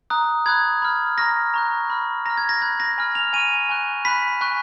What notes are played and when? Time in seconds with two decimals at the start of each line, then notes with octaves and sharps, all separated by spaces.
0.10 A#5 D#6 F#6
0.46 B5 D#6 F#6 G#6
0.82 B5 F6
1.18 A#5 C#6 F6 A#6
1.54 A#5 C#6 F#6
1.90 B5 F6
2.25 A#5 A#6
2.30 F6
2.38 G#6
2.49 A#6
2.62 B5 F#6 G#6
2.80 A#6
2.98 G#5 B5 F6
3.15 F7
3.33 G#5 C#6 F6 D#7
3.69 G#5 C#6 F#6
4.05 B5 F#6 B6
4.41 G#5 C#6 F#6